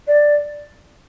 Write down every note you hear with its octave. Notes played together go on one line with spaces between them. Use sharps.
D5